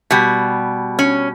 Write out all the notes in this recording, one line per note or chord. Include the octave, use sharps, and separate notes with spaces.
B2 G3
C#4